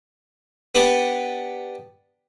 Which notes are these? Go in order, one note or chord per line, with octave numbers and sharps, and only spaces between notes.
B3 D4 G4 B4 D5